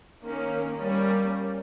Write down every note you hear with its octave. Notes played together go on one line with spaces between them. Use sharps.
D#3 A#3 C#4
G3 A#3 C#4